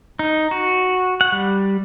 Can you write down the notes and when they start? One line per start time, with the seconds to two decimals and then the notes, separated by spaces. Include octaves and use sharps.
0.19 D#4
0.51 F#4
1.21 F#5
1.32 G3